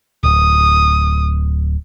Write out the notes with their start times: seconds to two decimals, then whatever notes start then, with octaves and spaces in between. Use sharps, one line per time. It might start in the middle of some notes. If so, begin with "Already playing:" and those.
0.23 D1 D#6